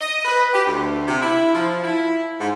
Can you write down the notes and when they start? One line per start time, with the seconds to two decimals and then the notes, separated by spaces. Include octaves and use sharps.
0.01 D#5
0.24 B4
0.53 G4
0.66 D2
1.07 C3
1.21 E4
1.55 F3
1.84 E4
2.40 G#2